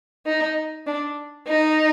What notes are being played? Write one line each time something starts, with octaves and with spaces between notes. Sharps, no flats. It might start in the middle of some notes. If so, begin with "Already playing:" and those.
D#4
D4
D#4